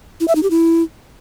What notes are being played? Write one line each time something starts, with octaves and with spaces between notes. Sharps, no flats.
E4
E5
D#4
G4
E4